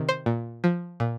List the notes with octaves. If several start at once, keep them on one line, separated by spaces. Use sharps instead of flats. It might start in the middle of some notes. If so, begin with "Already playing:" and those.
Already playing: C3 D#3
C5
A#2
F3
A#2